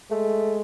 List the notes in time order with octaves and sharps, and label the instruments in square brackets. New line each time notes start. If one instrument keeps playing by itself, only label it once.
[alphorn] G#3 [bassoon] A3